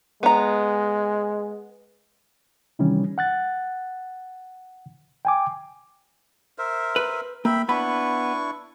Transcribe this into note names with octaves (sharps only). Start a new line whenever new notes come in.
G#3 B3 A#5
C3 D#3 E3 G3 C#4
F#5 F#6 A6
G5 G#5 D6
A#4 C5 E5
B4
A#3 E5 G5 B5
B3 D4 E4 B5 C#6